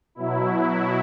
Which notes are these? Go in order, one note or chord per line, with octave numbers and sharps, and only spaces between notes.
B2 F#3 E4